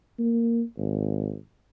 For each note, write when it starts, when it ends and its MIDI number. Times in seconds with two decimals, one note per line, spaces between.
0.19 0.63 58
0.78 1.36 32